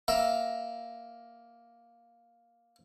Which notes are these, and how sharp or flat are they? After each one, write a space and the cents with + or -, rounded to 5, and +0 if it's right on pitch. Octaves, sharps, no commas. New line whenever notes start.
A#3 +5 E5 +0 A#5 +5